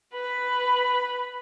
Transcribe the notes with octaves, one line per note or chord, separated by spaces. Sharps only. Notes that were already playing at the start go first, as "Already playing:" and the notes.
B4 B5